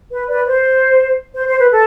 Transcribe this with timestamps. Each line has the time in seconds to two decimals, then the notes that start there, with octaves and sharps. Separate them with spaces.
0.11 B4
0.29 B4 D5
0.47 C5
1.35 C5
1.47 C5
1.58 B4
1.71 A4